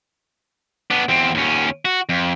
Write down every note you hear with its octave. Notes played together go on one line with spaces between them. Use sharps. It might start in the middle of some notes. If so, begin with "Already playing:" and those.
B3 D4
E2 C4
D#2 C#4
F#4
F2